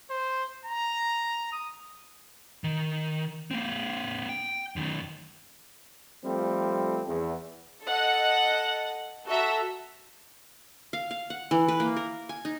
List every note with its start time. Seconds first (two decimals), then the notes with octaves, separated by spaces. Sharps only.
0.10 C5
0.65 A#5
1.52 D#6
2.64 D#3
3.51 A#3 C4
4.29 G5
4.76 F#2 D#3
6.24 F3 G3 A3 C4
7.08 E2
7.85 A4 D#5 F#5
9.27 F#4 A4 E5 A#5
10.93 F5
11.11 F5
11.30 F#5
11.51 E3
11.68 B4
11.80 A#3
11.96 A#4
12.29 G#5
12.45 D#4